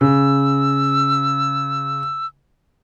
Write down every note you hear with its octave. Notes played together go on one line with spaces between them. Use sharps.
C#3 E6